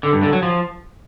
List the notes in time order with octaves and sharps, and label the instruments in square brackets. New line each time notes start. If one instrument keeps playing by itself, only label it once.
[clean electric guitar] D3
G2
D3
F#3
F3